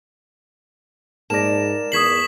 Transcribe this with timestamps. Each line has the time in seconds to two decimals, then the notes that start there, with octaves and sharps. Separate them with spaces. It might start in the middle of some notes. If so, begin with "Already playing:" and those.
1.30 G#2 A#3 D5 A5 A#6 E7
1.92 E2 C#6 D#6 G#6 B6 C7 F#7